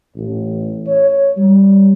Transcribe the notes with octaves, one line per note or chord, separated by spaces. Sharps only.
A1
C#5
G3